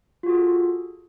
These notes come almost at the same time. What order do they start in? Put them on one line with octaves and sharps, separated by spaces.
F4 F#4 G#4 A4